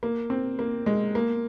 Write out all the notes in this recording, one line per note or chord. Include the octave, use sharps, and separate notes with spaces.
A#3
C4
A#3
G#3
A#3